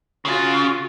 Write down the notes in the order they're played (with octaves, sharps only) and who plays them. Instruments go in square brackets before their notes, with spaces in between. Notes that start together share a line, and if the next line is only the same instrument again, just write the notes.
[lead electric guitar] C#3 [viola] F4 F#4